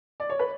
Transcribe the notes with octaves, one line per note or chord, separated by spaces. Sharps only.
D5
C#5
B4